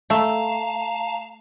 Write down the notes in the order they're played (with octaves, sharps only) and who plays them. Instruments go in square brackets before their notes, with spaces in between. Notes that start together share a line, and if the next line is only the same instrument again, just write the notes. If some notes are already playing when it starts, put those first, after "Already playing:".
[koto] A3 [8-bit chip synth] F5 A5 A#5